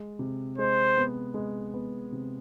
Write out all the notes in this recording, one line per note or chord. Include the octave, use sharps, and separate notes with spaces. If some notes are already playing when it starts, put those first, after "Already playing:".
Already playing: G#3
C3
G#3 C5
B3
G#3
B3
C3